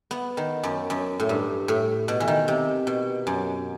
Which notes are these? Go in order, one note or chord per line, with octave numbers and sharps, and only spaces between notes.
B3
D#3
F#2
F#2
A2
G2
A2
B2
E3
D#3
C3
B2
F#2